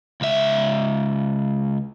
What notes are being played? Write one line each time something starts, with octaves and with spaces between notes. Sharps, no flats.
C#2 E5